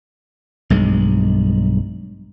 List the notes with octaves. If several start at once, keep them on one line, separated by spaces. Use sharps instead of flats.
B1 G2 G#3